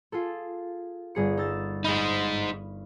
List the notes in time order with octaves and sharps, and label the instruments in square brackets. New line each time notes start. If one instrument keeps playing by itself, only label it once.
[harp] F4 G#4 A4
G1 G#4 C#7
D#4 E6 A6
[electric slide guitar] D#4 G#4 [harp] B5 D#6 F6